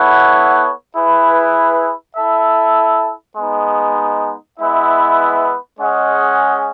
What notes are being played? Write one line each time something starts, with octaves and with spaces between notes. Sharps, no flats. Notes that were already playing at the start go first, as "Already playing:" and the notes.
Already playing: B3 E4 A4 C#5 F#5
E4 G#4 B4
E4 A4 E5
G#3 B3 D#4
G#3 B3 E4 B4 E5
G#3 C#4 G#4 D#5 F#5